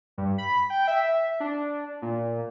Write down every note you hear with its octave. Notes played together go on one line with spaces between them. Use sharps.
G2
B5
G5
E5
D4
A#2